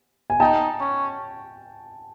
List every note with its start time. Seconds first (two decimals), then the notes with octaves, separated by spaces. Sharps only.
0.30 G#5
0.40 D#4 G5 A5
0.80 C#4